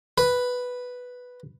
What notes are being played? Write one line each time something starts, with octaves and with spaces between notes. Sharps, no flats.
B4